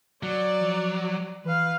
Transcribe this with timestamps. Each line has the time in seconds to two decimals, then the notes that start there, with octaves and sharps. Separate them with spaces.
0.23 F#3 D5
0.61 F3
1.44 E3 B4 F5